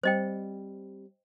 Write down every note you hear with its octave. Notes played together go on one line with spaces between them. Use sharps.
G3 C4 C5 D#5 G5